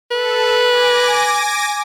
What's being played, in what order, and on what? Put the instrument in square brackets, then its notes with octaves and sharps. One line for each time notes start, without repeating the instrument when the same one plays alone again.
[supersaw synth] A4 [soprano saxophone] B4
[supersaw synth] G#5 D6 A#6